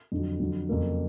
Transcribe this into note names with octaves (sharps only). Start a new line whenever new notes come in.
F2 D3 F#3
F2 D3 F#3
F2 C#3 F#3 A#3